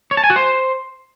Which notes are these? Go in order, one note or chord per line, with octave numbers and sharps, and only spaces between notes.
C#5
A5
G#5
F#4
C5